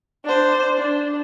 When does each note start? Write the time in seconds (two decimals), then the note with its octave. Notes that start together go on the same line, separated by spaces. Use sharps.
0.25 D4 C5
0.75 D4